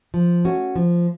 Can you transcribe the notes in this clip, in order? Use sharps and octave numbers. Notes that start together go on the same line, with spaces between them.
F3
A3 C#4 F#4
F3